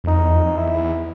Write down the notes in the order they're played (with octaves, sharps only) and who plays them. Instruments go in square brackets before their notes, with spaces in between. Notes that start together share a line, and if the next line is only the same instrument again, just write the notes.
[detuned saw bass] E2
[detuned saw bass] F2 [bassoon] D#4
[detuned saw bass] E2
F2
F2
[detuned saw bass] E2 [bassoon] E4
[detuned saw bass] E2